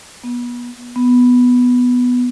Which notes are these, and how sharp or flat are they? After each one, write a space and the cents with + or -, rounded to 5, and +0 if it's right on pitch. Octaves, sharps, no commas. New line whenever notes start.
B3 -30
B3 +0